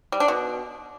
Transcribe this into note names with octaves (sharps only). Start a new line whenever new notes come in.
G3
D4
B2